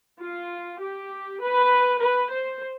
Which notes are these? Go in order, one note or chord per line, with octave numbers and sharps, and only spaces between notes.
F4
G4
B4
B4
C5